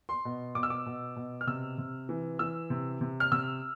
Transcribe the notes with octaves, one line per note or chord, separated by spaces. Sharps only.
C6
B2
B2 D6
E6
D6
B2
B2
F6
C3 E6
C3
E3
E3 E6
C3
C3
F6
C3 E6